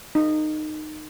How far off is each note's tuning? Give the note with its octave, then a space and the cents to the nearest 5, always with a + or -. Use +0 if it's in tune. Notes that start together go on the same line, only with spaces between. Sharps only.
D#4 -20